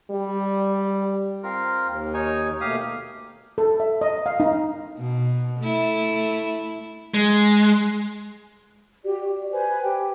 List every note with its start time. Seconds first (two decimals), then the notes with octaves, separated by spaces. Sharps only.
0.11 G3
1.43 C4 F4 A#4
1.84 D#2
2.14 D#4 C#5 G#5
2.61 B2 A3 A#3 G4 F5 D#6
3.58 A4
3.80 E5
4.01 D#5
4.26 F5
4.40 D#4
4.98 B2
5.59 A3 E4
7.14 G#3
9.04 F#4 G4 D5
9.23 D5
9.52 B4 C5 G#5
9.83 G4 G5